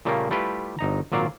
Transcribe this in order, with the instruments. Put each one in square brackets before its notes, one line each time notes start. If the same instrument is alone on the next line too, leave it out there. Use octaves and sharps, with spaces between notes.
[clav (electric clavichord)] A#2 C#3 G3 A3 A#3
G3 A3 E4 F4 G4 B4
G1 D#4 A#5
G#1 A#2 F#3 D5 F5